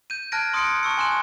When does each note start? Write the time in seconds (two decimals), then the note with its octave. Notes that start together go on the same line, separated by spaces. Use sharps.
0.10 G6 D#7
0.32 A5 F6 F#6 G#6 A#6 D7
0.53 C6 D#6 F#6 A#6 C#7 D7
0.83 A5 C#6 E6 C#7
0.98 G#5 C6 F#6 E7